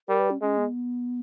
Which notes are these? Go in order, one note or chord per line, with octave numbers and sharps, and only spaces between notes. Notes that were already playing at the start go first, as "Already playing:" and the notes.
G3 A#4
B4
C#4
G#3 C#4
B3